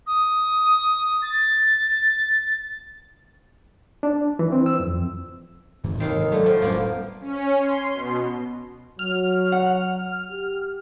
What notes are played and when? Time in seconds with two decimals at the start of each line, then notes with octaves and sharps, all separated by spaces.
0.07 D#6
1.22 A6
4.03 D4
4.39 E3
4.52 C4
4.66 E6
4.80 F2
5.84 G#2 C3 E3
6.00 D#2 D#3 F5 A#5
6.32 D3 F#3 A3
6.46 A2 F3 C6
6.62 E1 G3 A#3 B3 C#4
7.21 C#4
7.60 C6
7.93 B2
8.99 F#3 F6
9.52 F#5
10.30 G4